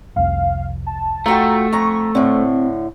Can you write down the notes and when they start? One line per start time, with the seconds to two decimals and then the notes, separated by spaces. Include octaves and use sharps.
0.16 F1 C2 F5
0.87 A5
1.26 A3 F4 F#4 G5 A#5
1.73 F2 A#5 C#6
2.15 A2 D3 C4